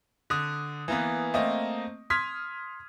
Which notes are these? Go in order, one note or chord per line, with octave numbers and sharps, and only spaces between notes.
D3 D#6
E3 A#3 B3
A3 A#3 C4 D#5
C6 D#6 F6 G#6 B6